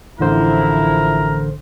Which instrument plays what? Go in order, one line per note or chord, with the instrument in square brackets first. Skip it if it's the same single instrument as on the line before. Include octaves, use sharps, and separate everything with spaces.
[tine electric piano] A1 D3 C5 [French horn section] F3 E4 [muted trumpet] A#4